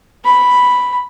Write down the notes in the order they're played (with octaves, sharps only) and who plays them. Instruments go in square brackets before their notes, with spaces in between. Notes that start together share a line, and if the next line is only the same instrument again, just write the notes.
[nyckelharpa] B5